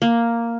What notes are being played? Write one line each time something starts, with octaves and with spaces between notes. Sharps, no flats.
A#3